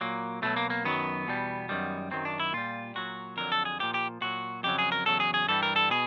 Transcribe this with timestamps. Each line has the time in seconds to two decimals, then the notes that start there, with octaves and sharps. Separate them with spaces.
0.01 A#2 F#3 A#3
0.42 B2 F#3 A3
0.57 A#3
0.70 A#3
0.85 F#2 D#3 F#3 B3
1.27 E2 B2 G3
1.69 F#2 D#3 G3
2.11 F#2 D#3 F#3 C4
2.25 D4
2.40 E4
2.53 A#2 G3 F4
2.95 A#2 F#3 F#4
3.37 F2 D3 F#3 A#4
3.52 A4
3.65 G#4
3.80 A#2 F3 G4
3.94 G4
4.21 A#2 F#3 F#4
4.63 F2 C#3 F#3 G4
4.79 G#4
4.92 A#4
5.06 E2 C#3 F#3 A4
5.20 G#4
5.34 G#4
5.48 G2 E3 G3 A4
5.63 A#4
5.76 A4
5.90 B2 G#4